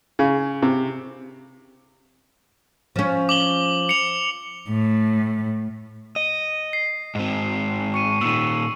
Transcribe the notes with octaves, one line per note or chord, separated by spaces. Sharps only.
C#3
C3
F3 C#4
D6 F#7 G7
C#7 F7
A2
D#5
C7
G#2 C4
C#6 C#7 D#7
A#2 D#3 E6